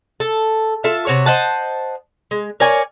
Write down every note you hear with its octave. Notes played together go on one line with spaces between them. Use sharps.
A4
F4 A4 E5 A5
C3 F#4 C#5
C5 D#5 F#5 A5
G#3
A#4 C#5 D5 G#5